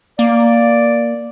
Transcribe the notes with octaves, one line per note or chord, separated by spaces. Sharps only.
A#3 D5